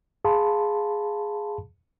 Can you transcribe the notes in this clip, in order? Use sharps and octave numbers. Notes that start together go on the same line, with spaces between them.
G#4 F5 A5 B5 C6